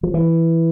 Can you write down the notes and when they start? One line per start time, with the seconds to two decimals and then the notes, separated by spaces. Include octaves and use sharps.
0.03 F3
0.14 E3